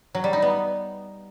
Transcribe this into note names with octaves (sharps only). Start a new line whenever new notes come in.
F#3
G3
D#4
B3